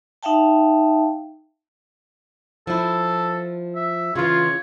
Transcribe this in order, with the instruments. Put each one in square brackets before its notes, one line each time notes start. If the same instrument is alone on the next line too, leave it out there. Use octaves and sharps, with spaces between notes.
[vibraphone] D#4 E5 F5 G5 A5
[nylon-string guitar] F3 E4 [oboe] A4
[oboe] E5
[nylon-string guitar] C#3 E3 [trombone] F4 [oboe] C#5